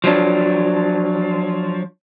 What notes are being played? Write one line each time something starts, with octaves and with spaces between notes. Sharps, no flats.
F3 F#3 D4